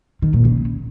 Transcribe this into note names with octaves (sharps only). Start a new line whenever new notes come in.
D#3
A#2
C#3